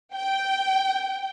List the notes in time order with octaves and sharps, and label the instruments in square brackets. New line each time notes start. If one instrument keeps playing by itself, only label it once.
[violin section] G5